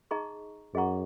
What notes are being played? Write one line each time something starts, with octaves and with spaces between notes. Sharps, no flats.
D#4 G#4 D#5 A#5 C#6
F#2 G#4 D#5 F#5 A#5 C#6